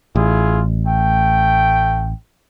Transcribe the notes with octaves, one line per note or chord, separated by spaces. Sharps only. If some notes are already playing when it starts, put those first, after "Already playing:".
A1 E4 F4 G#4
A3 G5